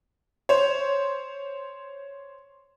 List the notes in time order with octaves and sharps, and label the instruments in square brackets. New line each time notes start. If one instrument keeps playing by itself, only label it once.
[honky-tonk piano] C5 C#5